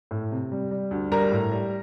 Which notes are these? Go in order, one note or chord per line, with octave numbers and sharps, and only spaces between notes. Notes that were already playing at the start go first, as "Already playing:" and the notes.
A2
C3
G3
G3
D2
G3 A#4 A#5
A2
G3